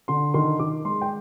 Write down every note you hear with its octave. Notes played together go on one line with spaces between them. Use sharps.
D3 C6
D#3 C6
D#3 D6
G#3 C6
G5